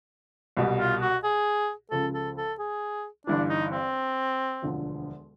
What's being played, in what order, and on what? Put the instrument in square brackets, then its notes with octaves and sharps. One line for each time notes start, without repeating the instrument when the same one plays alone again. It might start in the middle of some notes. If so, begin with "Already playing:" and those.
[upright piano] C2 B2 G3
[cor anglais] F4
F#4
G#4
[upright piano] C#2 C#3 F3 [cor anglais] A4
[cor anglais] A4
A4
G#4
[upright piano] G1 G2 E3 [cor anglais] D4
[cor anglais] D#4
C4
[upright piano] E1 D2 D3 F3